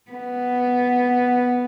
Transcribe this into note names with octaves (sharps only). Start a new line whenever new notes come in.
B3